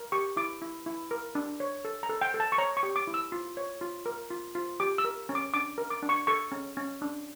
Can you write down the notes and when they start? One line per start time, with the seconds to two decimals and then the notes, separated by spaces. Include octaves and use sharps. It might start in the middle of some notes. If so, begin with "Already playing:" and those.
Already playing: A#4
0.12 G4 C#6
0.37 E4 D6
0.62 E4
0.86 E4
1.11 A#4
1.35 D4
1.60 C#5
1.85 A4
2.03 A#5
2.09 A4
2.21 G5
2.34 A4
2.40 A5
2.52 C#6
2.58 C#5 A#5
2.77 C#6
2.83 G4
2.96 D6
3.07 E4
3.14 E6
3.32 F4
3.57 C#5
3.81 F4
4.06 A#4
4.30 F4
4.55 F4
4.80 G4 D6
4.98 E6
5.05 A#4
5.29 C#4
5.35 D6
5.54 D4 D6
5.78 A#4
5.90 D6
6.03 D4
6.09 C#6
6.27 A4 C#6
6.52 C#4
6.77 C#4
7.02 D4